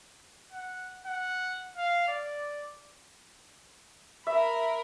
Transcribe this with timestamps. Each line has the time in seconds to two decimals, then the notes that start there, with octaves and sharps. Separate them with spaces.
0.52 F#5
1.06 F#5
1.77 F5
2.08 D5
4.27 A#4 E5 B5